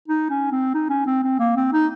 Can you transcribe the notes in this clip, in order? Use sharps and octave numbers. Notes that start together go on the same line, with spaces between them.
D#4
C#4
C4
D#4
C#4
C4
C4
A#3
C4
D#4